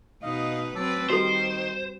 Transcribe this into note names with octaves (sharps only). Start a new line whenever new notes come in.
B2 D#4 B4 D#5 F5
F#3 C4 B4 A5 D6 E6
D#3 G3 F#4 G4 A4 C5